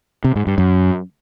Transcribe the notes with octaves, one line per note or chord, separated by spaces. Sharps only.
C3
G#2
G2
F#2